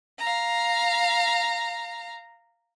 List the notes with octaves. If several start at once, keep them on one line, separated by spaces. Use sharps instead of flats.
F5 A#5